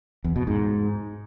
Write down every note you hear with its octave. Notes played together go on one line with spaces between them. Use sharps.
E2
B2
G#2